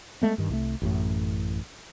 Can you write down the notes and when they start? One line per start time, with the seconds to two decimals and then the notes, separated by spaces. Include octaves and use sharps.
0.22 G#3 A3 B3
0.38 G2 D#3
0.49 C2 E3 A3
0.82 A1 F#2 A2